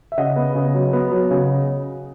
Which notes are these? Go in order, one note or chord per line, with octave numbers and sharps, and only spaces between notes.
E5
C#3 D#5 F#5
B3
C#3
F#3
B3
F#3
C#3